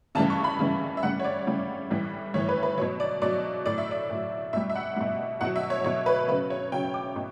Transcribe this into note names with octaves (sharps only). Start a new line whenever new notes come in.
C#3 E3 G3 A5
C#6
B5
C#3 E3 G3
E5
C#3 G3 F#5
C#5
D5
C#3 G3
A2 E3 G3
A2 E3 G3 C#5
B4
B4
B2 F#3 C#5
D5
B2 F#3 D5
A2 F#3 D5
E5
D5
A2 F#3
B2 G3 E5
E5
F#5
B2 G3
B2 F#3 F#5
E5
C#5
B2 F#3 C#5
B4
C#3 F#3 B4
C#5
C#3 F#3 G5
D6
B2